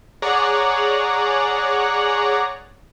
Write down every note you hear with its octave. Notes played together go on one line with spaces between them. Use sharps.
G#4 C#5 D5 F#5 A#5